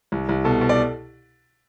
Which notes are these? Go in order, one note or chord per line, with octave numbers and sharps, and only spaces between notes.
C2
C2
B2 A4
B2
D5